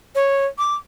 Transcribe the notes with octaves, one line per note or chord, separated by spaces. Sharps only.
C#5
D6